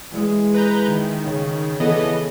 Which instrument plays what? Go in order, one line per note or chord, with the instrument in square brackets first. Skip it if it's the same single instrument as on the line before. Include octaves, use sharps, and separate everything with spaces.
[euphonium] E3 [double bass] G#3
[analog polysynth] B4 A#5 G6
D#3
[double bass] C#3
[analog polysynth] E3 B3 D#5 [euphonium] A4